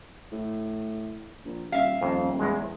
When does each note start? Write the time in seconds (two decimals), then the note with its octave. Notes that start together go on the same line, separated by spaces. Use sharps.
0.32 A2
1.45 A#1
1.72 D#1 E5 F5
2.01 D#1 F2
2.39 E2 G#3